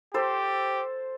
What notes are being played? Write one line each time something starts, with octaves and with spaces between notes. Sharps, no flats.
G4 A4 C5